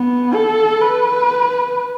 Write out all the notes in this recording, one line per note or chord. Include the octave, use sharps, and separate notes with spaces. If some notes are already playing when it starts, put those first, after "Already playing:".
Already playing: B3
A4
B4